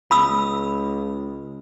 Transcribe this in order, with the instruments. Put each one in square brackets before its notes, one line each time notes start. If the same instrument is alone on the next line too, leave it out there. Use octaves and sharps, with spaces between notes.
[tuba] C#2 [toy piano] B5 D#6 E6